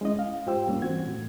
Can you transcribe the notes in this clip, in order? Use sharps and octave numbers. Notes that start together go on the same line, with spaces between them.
G#3 C#4 E4 D#5
F5
G#2 F4 G4 C5 G5 E6
G3 A#3 C#4 D4
E3 C4 F#4 G#6
A2